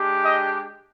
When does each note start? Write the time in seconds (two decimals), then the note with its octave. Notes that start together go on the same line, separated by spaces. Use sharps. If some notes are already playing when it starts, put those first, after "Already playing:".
Already playing: G#3 D4 G4
0.24 D#5